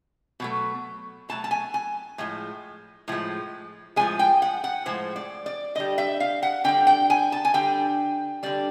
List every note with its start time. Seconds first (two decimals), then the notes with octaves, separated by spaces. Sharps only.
0.40 B2 F#3 A3
1.29 B2 F#3 A3 A5
1.44 A5
1.51 G#5
1.74 G#5
2.18 A2 F3 G#3
3.08 A2 F3 G#3
3.96 A2 F3 G#3 G#5
4.19 G5
4.42 F#5
4.64 F#5
4.86 A2 F3 G#3 C5
5.16 D5
5.46 D5
5.75 D3 G3 D#5
5.98 E5
6.20 F5
6.43 F#5
6.64 D3 G3 G5
6.87 G5
7.10 G#5
7.32 A5
7.45 G#5
7.54 D3 G3 G5
8.43 D3 G3 D5